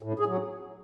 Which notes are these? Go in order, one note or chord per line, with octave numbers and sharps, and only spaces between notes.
A2
G#4
F#3